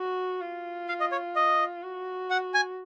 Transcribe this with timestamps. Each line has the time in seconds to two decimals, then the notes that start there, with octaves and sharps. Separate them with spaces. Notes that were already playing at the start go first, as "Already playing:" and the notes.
Already playing: F#4
0.41 F4
0.88 F5
1.00 D#5
1.12 C#5
1.36 D#5
1.83 F#4
2.30 F#5
2.54 G#5